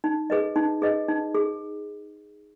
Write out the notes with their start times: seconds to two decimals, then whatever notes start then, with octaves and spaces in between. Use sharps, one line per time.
0.04 D#4
0.30 G#4 B4 D#5
0.56 D#4
0.82 G#4 B4 D#5
1.08 D#4
1.35 G#4